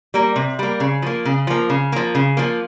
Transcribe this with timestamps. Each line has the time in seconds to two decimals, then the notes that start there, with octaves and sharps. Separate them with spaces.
0.14 G3 A#3
0.36 C3
0.59 G3 A#3
0.80 C#3
1.02 F3 A#3
1.25 C#3
1.47 F3 A#3
1.70 C#3
1.92 F3 A#3
2.15 C#3
2.37 F3 A#3